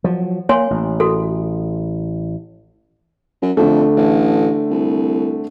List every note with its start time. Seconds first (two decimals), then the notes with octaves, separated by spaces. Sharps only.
0.04 F3 F#3
0.49 A#3 C#5 G#5 C6
0.70 A1
1.00 F#4 A4
3.42 F#2
3.57 F2 D3 A3
3.96 A1
4.70 C2